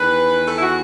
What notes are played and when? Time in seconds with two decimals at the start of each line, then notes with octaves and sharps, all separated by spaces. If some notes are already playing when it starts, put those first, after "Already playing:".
Already playing: E2 D#3 B4
0.45 A4
0.56 E4
0.60 F#4